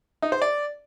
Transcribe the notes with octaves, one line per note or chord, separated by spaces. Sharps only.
D#4
C5
D5